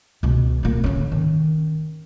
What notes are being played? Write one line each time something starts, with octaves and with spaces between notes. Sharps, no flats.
C#2 B2
A#2 A#3
D3 C#4
D#3